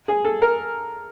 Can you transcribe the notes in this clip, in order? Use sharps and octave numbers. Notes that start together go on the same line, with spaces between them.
G#4
A4
A#4